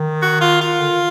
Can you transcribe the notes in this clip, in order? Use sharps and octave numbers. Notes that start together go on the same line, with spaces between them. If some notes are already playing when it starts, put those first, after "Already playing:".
Already playing: D#3
F#4
F4
F4
D3
D#3